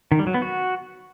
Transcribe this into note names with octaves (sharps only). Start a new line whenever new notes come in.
D#3
G3
F#3
B3
F#4